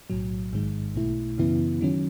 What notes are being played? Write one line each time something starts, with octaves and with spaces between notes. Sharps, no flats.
B1 A2 F#3
A1 G#2 D#3 G#3
B1 B2 A3 E4
F#2 C#3 E3 B3 E4
D#3 F#3 C#4